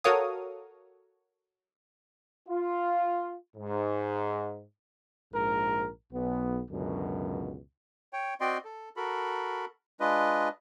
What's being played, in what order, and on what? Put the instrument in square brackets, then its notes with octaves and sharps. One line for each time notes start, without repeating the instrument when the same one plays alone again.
[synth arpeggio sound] F#4 A4 A#4 C#5 F5 D#6
[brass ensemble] F4
G#2
[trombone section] A#1 G#2 A#4
B1 B3
C#2 F#2 B2 D3
[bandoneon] C#5 G5
C4 F#4 D5 D#5 G5 C6
A4
F#4 A4 A#4 B5
G#3 D4 F4 B4 D#5